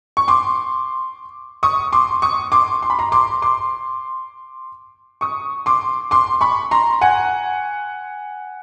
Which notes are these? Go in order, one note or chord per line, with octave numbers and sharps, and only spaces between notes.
C#6
C6 D6
C#6 D#6
C6 D6
C#6 D#6
C6 D6
C6
B5
A#5 C6
C6 D6
C6 D6
C#6 D#6
C6 D6
C6 D6
B5 C#6
A#5 C6
F#5 G#5